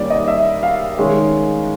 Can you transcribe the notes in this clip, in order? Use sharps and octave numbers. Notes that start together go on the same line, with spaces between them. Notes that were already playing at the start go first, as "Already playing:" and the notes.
Already playing: D#3 G3 A#3 C#4 D5
D#5
E5
F5
D#3 G#3 C#4